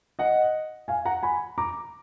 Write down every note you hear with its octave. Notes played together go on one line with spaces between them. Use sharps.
D#5 F#5
F5 G#5
F#5 A#5
G#5 B5
A#5 D6